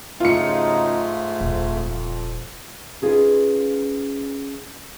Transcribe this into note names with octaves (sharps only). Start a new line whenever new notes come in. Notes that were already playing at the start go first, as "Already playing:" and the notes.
G#2 C#3 F#3 A3 D#4 F4 C#7
D#1 F2
C#4 D#4 F4 G#4 B4